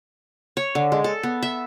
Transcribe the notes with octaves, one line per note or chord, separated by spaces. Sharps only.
C#5
D3
G#3
A4
B3
E5